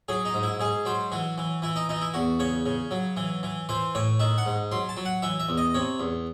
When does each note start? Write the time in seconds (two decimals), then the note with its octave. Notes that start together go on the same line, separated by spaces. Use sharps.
0.08 F#3 G#4
0.25 D#4
0.34 G#2
0.43 E4
0.60 G#2 G#4
0.85 F#3 C5
1.12 E3 F#4
1.38 E3
1.62 E3 E4
1.76 D#4
1.89 E3 D#4
2.01 E4
2.14 E2 F#4
2.39 C#3 C#5
2.66 C#3
2.91 F#3
3.17 E3
3.43 E3
3.69 E3 C5
3.95 A2 C#5
4.20 D#3 E5
4.38 F#5
4.46 G#2
4.72 F#3 C6
4.89 A5
4.97 F#3
5.05 F#5
5.22 E3 E5
5.40 E5
5.49 E2
5.57 D#5
5.74 C3 C#5
6.00 E2